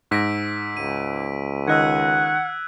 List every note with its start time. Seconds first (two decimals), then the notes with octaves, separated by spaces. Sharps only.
0.11 G#2 E6 A#6 B6 D7
0.77 C#2 D#7
1.67 D#3 D#5 F#5 E6 F#6 G#6